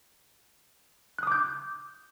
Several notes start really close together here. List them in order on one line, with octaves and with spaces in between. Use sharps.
F#6 D#6 D6 G6